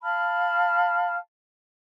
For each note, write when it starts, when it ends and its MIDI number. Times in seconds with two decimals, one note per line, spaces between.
0.03 1.16 77
0.03 1.16 81
0.03 1.16 83
0.03 1.16 89